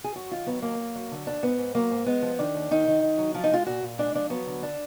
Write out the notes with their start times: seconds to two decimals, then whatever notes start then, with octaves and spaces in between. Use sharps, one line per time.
0.04 G#4
0.16 F#2 F#4
0.31 D#3 F4
0.46 F#3 B3
0.62 D#2 A#3
0.79 F#2
0.95 F#3
1.11 D3
1.27 D#2 D4
1.43 G#2 B3
1.58 G#2
1.75 F#3 A#3
1.91 G#2
2.06 G#3 B3
2.22 F3
2.39 D#3 D4
2.55 D#2
2.71 D#3 D#4
2.87 D#3
3.03 D#3
3.18 F#3
3.34 F3 F4
3.44 D#4
3.51 G#3 F4
3.66 A#2 F#4
3.83 A#2
3.98 G#3 D4
4.15 F3 D4
4.30 F#3 B3
4.46 D3
4.63 D4